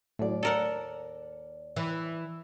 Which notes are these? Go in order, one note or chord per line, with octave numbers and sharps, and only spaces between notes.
D#2 A2 F#3 D5
A4 A#4 F#5
E3